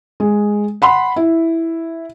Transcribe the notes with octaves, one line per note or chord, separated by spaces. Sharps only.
G#3
F#5 B5 C6
E4